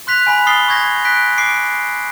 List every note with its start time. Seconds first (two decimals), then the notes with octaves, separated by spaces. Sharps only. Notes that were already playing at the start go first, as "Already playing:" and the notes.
0.07 C6 F#6 B6 F7
0.27 G#5 B5 B6
0.47 D#6 F6 A6 C7 G7
0.68 C#6 D#6 G6 G#6 A#6
1.05 F#6 B6 D7
1.38 D6 C7 D7